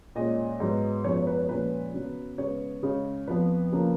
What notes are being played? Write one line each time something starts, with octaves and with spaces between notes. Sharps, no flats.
A#2 G#3 C#4 D#5
G#2 F#3 B3
F#2 F3 G#3 B3 C#5
C#5
B4
C#5
A#2 F3 G#3 C#4 B4
C#3 F#3 B3
C#3 G#3 B3 C#5
C#3 G#3 C#4
F2 F3 B3 B4
C#3 F3 A#3